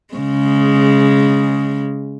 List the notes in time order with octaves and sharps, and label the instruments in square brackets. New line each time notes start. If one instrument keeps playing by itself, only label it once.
[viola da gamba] C#3 G#3